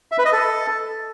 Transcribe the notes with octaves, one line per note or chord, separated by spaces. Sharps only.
E5
B4
D#5
A4